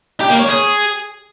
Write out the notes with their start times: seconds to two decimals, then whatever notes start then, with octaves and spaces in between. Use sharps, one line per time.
0.20 G4
0.30 A#3
0.39 C#5
0.48 G#4